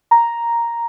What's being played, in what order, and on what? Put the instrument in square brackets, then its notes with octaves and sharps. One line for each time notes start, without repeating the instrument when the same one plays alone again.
[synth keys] A#5